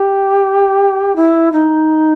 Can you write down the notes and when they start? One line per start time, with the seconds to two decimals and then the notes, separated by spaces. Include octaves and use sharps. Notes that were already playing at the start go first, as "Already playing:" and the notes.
Already playing: G4
1.15 E4
1.52 D#4